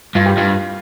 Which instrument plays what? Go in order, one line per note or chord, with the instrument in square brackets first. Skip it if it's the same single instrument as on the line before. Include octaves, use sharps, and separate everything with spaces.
[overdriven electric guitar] G2 [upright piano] F4
[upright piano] G4
[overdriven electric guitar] G2 [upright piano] F4